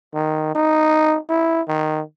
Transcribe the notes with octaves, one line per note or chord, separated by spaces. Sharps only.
D#3
D#4
E4
D#3